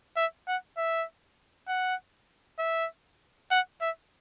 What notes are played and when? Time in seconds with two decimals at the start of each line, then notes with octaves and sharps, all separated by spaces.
0.16 E5
0.47 F#5
0.77 E5
1.68 F#5
2.59 E5
3.51 F#5
3.81 E5